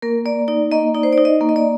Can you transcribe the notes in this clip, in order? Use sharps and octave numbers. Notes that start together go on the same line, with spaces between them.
A#3 A#4
A#3 D5
D#4 D5
A#3 D#5
D#4 D5
C5
D5
D#4
D#5
A#3
D#5
D5